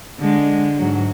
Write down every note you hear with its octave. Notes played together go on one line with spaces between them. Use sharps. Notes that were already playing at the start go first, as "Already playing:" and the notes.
D3 G#3
G#2 F#3